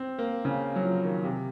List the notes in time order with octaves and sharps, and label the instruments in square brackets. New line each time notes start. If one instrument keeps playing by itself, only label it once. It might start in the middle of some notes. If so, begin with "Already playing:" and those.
Already playing: [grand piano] C4
A#3
C#3
F#3
F3
D#3
C3